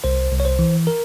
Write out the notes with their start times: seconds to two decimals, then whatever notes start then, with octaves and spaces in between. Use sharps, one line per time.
0.04 C2 C5
0.32 C2
0.40 C#5
0.45 C5
0.59 E3
0.87 A#4